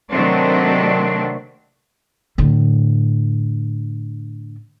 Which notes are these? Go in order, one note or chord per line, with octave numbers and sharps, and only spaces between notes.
C3 D#3 F#3 A3 C4 D4
A2 D3